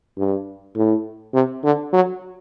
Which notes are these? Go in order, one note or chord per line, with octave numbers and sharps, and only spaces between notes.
G2
A2
C3
D3
F#3